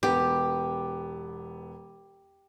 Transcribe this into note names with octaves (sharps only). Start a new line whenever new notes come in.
E1 B3 G4